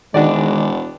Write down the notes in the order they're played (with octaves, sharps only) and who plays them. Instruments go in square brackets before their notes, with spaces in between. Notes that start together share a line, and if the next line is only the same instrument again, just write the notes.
[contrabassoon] E1 [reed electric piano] D#3 D#4 [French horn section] G#3 [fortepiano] D4 F#4 D5